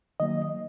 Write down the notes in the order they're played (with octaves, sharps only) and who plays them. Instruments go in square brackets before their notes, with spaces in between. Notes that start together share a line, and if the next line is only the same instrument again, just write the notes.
[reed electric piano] D#3 F#3 A#3 D#5